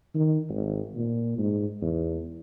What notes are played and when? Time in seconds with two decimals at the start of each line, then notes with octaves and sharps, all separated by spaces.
0.15 D#3
0.49 G#1
0.95 A#2
1.38 G#2
1.82 E2